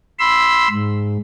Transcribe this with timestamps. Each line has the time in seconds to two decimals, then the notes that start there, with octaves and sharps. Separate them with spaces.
0.19 B5 C6 E6
0.70 G#2